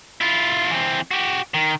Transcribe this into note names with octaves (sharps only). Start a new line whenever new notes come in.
E4 F4
E3 C4
F#4 G4
D#3